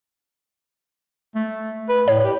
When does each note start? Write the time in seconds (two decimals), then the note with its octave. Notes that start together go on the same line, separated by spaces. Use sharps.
1.36 A3
1.89 B4
2.08 A2 C#5
2.24 G4